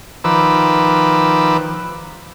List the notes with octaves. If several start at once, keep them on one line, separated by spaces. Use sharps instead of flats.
D#3 F3 B4 D6 E6